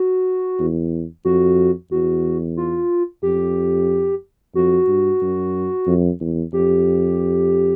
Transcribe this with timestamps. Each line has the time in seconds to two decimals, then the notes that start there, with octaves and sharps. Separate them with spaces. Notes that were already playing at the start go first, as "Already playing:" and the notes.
Already playing: F#4
0.59 E2
1.25 F2 F#4
1.91 E2 F#4
2.57 F4
3.22 F2 G4
4.55 F2 F#4
4.87 G2
5.22 F#2
5.87 F2
6.20 E2
6.53 F2 G4